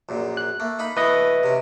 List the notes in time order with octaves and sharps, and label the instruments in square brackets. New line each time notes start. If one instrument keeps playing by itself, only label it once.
[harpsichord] A#1 F#2 A#2
[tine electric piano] F#6
[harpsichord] A3 A#3
A#3 D#4 B5
[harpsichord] E3 A3 [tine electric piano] B4 D#5
[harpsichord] C3 C#4